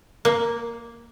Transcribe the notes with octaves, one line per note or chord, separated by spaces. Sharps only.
A#3